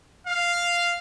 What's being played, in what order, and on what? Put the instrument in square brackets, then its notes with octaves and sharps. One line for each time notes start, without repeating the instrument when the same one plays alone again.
[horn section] F5